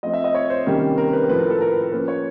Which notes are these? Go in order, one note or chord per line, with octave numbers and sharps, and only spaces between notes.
F3 A3 C4 D#5
E5
D#5
C#5
C5
C3 D#3 G3 A#3 C#4
A#4
B4
A2 F3 A3 B4
A#4
A4
A#4
B4
A#4
F3 A#3 C#4 B4
C#5